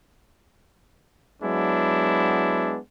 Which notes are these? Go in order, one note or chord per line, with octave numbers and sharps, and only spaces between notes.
F#3 G#3 B3 D4 E4